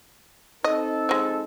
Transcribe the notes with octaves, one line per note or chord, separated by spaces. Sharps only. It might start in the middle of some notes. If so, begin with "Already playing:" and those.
C4 D#4 A4 D#5
F3 G#3